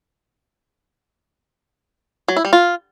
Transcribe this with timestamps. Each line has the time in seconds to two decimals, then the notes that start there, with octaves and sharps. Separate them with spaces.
2.28 F#3
2.37 E4
2.45 G3
2.53 F4